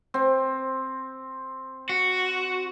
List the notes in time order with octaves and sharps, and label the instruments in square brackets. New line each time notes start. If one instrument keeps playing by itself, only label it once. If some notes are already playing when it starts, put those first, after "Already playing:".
[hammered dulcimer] C4
[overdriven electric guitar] F#4